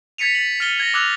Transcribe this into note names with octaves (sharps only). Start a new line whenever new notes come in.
G#6 A6 B6 C#7 D#7 F7
A6 F#7
F6 A6 D#7 G7
G#6 A#6
D6 E6 F#6 G#6 F7